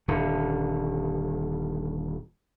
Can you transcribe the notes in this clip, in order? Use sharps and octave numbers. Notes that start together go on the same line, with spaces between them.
D#1 D3